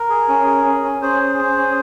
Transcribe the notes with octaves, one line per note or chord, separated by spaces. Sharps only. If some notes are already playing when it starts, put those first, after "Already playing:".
Already playing: A#4
G#4
C#4
G#4
C#4
C#4
C#4 G#4 C5
G#4
G#4
C#4